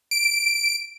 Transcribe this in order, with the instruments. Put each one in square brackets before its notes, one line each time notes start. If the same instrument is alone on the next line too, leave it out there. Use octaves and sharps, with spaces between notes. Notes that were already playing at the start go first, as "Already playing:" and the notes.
[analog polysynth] D7